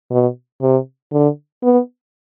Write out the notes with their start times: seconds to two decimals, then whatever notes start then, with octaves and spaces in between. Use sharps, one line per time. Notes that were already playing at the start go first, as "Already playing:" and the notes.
0.11 B2
0.61 C3
1.12 D3
1.63 B3